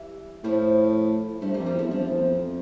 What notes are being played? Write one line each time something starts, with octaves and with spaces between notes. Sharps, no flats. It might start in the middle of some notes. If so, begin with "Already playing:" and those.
Already playing: E3 G3
A2 F3 A3
G2 F3 A3
G3 A#3
F2
G3 A#3
E2 F3 A3
G2 F3 A3
F2
E2
F2